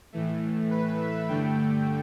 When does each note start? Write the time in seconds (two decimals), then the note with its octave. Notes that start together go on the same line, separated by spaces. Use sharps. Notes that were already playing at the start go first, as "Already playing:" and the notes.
0.12 A2 E3 A3
0.71 B4
1.00 E5
1.28 G2 D3 A3 G5